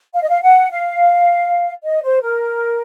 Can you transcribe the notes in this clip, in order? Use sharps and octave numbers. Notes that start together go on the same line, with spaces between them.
F5
D#5
F5
F#5
F5
D#5
C5
A#4